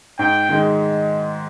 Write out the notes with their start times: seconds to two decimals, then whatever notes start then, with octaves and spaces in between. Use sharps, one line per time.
0.19 G#2 G5
0.49 D#3 G#3